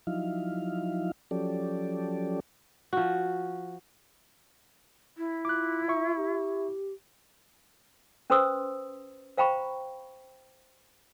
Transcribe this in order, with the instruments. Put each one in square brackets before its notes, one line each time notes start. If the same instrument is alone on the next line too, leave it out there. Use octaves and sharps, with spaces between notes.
[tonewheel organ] F3 F#3 D#4 E4 F5
F3 F#3 C#4 G4 A4 D5
[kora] F3 F#4
[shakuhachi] E4
[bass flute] F4 [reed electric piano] D6 F#6
[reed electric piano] E5 C#6
[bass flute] G4
[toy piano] C#4 B4 C5 C6 D#6 E6
C5 F5 G5 A#5 B5 C#6